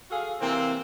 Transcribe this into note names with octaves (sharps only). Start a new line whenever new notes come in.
F#4 G#4 A4 F5
C3 E3 A#3 C4